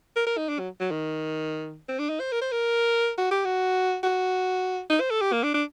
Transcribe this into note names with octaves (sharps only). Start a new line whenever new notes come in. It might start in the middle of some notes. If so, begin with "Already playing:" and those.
A#4
A#4
D#4
D4
F#3
F#3
D#3
C4
D4
D#4
C5
A#4
C5
A#4
F#4
G4
F#4
F#4
D#4
C5
A4
G4
A#3
D4
D4